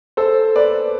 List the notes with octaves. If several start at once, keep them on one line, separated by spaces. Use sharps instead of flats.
A4 C5
B4 D5